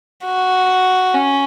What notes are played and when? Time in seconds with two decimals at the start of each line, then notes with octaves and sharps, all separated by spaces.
0.25 F#4
1.14 C#4